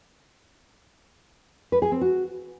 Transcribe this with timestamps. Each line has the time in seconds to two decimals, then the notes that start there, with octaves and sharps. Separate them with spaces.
1.72 B4
1.82 G#4
1.92 C4
2.01 F#4